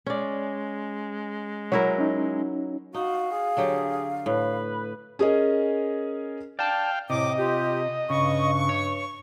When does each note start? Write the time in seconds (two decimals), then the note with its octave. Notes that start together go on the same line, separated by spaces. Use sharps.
0.06 G#3 C#4 D5
1.72 F#3 E4 A#4 C#5
1.98 C#4 D#4
2.94 D#4 F#4 F5
3.31 G#4
3.57 D3 F#3 G4
4.26 A2 B4
5.19 C#4 G#4 A#4 D#5
6.59 D5 F5 G5 A5
7.10 A2 C3 D#5 D6
7.38 F4 G4
8.10 G2 C#3 C#6
8.69 C#5